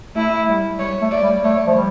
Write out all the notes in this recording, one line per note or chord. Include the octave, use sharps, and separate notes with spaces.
A3 E4
G3
G3 C#5
A3
D5
G3
A3 C#5
F3
G3